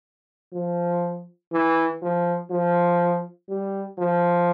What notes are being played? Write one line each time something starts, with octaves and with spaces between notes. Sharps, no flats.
F3
E3
F3
F3
G3
F3